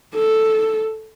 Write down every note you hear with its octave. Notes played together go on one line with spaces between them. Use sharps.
A4